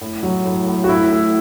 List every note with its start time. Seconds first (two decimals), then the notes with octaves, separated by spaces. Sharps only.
0.01 A2
0.23 F#3
0.45 A2
0.67 A2
0.84 F#4
0.89 A2 E4
1.12 A2